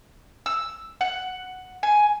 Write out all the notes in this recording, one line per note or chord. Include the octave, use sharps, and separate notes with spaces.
E6
F#5
G#5